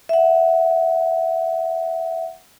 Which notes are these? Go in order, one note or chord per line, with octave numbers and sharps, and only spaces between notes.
E5 F#5